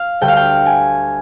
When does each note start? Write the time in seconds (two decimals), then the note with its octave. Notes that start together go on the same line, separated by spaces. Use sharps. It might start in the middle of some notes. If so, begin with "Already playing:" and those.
Already playing: F5
0.21 D2 D3 G3 G5
0.28 F5
0.36 G5
0.66 G#5